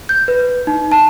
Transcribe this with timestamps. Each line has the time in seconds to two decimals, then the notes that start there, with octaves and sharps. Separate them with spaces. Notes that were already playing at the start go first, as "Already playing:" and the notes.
0.09 G6
0.28 B4
0.67 D#4
0.92 A5